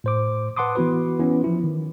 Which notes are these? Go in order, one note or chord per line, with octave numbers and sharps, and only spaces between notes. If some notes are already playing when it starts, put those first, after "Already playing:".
A2 C5 D6
B4 F#5 A5 C6 D6 D#6
E3 B3 F#4 B4
E3 B3 C#4
F3 E4
D#3